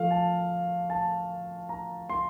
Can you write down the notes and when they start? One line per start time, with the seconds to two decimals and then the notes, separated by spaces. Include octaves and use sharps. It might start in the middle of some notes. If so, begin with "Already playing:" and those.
Already playing: F3 A3 F5
0.11 A5
0.90 A5
1.69 A#5
2.10 C6